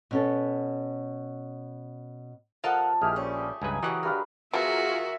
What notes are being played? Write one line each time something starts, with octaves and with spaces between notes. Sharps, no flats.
B2 C#4 A4
F3 A4 A#4 D#5 F5 F#5 A5
A#1 G#3 E4 G4 G#4 F6
F3 G3 A3 C#4
C#2 G2 G#4 B4 G#5 A#5
A#2 C#3 E3 F#3 F#4 G4 D#5 F#5
G2 F#3 A#4 B4 F5
F3 B3 F4 F#4 G#4 A#4 E5